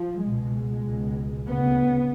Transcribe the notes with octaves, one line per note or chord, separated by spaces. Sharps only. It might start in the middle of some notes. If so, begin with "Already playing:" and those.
Already playing: F3
C#2 B2 G#3
C#2 B2
D2 C#3 B3